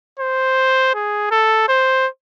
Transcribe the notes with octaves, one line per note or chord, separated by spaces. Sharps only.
C5
G#4
A4
C5